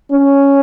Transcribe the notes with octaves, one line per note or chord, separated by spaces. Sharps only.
C#4